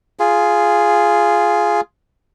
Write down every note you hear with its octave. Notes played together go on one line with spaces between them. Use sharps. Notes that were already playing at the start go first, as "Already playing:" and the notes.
F4 G#4